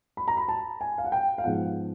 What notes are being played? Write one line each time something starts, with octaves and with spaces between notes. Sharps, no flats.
B5
A#5
B5
A5
G#5
F5
F#5
G5
F5
G#2 F3 G#3 B3 F#5